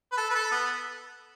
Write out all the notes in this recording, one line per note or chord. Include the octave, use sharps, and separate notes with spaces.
B4
A4
B4
A4
B3